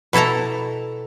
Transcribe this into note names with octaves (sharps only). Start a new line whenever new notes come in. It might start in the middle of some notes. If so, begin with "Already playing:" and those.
B2 E4 A4 A5 A#5